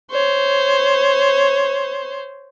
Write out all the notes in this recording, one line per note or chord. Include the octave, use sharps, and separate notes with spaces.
C5 C#5